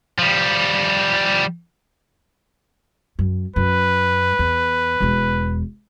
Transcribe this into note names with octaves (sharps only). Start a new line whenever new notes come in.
F3 G3
F#2
F#2 B4
E2
E1 E2